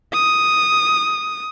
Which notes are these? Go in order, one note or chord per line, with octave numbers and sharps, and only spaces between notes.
D#6